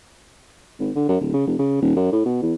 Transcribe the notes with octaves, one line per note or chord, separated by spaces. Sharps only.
G#1
D3
F#2
D1
C#3
F1
C#3
D#1
F#2
A2
B2
E2